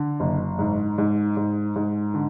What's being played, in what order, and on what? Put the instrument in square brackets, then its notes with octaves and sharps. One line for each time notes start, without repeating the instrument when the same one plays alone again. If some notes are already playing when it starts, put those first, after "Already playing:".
Already playing: [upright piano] D3
F#1
G#2
G#2
G#2
G#2
D3